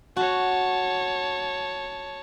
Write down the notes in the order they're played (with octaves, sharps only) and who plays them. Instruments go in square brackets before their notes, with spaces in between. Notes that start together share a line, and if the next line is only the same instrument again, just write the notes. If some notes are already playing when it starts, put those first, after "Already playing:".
[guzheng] F#4 [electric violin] C#5 A5